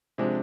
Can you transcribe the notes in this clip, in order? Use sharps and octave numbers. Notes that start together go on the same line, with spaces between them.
C3 F3 G#3 D4